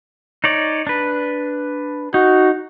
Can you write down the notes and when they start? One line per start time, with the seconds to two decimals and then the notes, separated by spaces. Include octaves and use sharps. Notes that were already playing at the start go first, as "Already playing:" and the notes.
0.44 D#4 C#5 D5
0.87 D4 B4
2.14 D#4 F#4